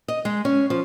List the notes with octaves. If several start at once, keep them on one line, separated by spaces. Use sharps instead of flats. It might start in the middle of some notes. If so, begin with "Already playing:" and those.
D#5
G#3
C#4
F3